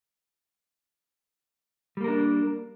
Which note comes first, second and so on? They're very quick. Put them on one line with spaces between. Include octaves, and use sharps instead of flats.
G3 A#3 A#4 D4